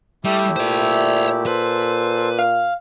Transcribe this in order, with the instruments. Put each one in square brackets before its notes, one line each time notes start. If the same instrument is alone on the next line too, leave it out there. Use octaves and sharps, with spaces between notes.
[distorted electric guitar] G3 [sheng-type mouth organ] A3 E4 G4
[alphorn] A#2 [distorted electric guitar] C5 D5
[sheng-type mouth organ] A4 C5 [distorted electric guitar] B4
[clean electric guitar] F5